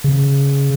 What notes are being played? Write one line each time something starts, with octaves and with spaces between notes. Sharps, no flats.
C#3